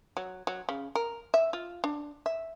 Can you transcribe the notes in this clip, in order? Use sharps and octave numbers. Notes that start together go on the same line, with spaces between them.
F#3
F#3
C#3
A#4
E5
F4
D4
E5